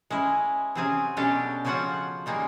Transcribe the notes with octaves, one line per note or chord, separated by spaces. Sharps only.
G#3 C#4 E4
C3 F#3 C4 C#4 G#4 G#5
B2 G#3 C#4 D4 G4 A4
C#3 F3 C#4 F4 F#4 F#5
D#3 G3 G#3 A#3